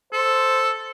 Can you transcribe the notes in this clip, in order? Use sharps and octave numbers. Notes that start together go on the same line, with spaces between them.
A4 C5